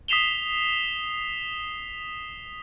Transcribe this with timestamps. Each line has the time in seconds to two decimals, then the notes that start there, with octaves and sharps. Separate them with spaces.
0.08 D#6 B6 C7 E7 F7 G7